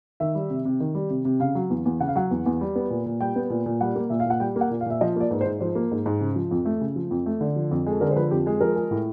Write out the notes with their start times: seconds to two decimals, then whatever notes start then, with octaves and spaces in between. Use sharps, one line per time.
0.20 D#3 E5
0.35 G3
0.50 C3
0.65 C3
0.80 D#3
0.95 G3
1.10 C3
1.25 C3
1.40 C#3 F5
1.55 F#3
1.70 E2
1.86 E2
2.00 C#3 F#5
2.08 F5
2.16 F#3 F#5
2.31 E2
2.46 E2
2.61 G3
2.75 B3
2.90 A#2
3.06 A#2
3.21 G3 G5
3.36 B3
3.50 A#2
3.66 A#2
3.81 G3 F#5
3.96 A#3
4.10 A#2 E5
4.20 F5
4.26 A#2 F#5
4.40 G3 G5
4.56 A#3 F#5
4.71 A#2
4.81 F5
4.86 A#2 E5
5.01 F3 D#5
5.16 A#3 D5
5.31 G#2 B4
5.41 C5
5.46 G#2
5.61 F3 C5
5.75 A#3
5.91 G#2
6.06 G#2
6.21 C#3
6.36 F3
6.51 F2
6.66 A3
6.81 C#3
6.96 F3
7.11 F2
7.26 A3
7.41 D3
7.56 F3
7.71 F2
7.86 G#3 A4
8.01 D3 A#4
8.11 C5
8.16 F3 B4
8.31 F2 G4
8.46 G#3 G#4
8.61 F3 A#4
8.76 G#3
8.91 A2